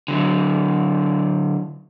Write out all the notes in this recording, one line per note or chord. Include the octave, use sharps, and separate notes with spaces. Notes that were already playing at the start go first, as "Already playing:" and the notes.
D3 F#3